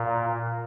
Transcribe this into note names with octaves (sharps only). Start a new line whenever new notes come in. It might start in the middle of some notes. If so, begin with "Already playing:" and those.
Already playing: A#2